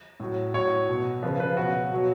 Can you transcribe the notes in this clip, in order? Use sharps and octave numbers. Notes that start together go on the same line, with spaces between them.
A2 F#3
A2 F#3 C#5
B2 F#3
C#3 F3 B4
B4
B2 F#3 F#4
B2 F#3